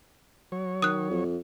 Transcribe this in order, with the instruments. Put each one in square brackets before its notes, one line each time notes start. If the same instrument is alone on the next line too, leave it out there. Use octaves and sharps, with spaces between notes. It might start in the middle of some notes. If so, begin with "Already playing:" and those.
[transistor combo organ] F#3 C#5
[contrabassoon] D#3 [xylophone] D#6 F#6
[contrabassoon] F2